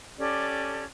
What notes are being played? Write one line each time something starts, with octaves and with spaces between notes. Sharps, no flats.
C#4 G4 A4 D5